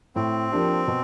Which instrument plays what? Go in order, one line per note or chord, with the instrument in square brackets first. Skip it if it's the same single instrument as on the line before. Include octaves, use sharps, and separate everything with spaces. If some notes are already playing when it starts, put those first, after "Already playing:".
[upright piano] A2 [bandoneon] C4
[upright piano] F3 A#3 D4 G4
B2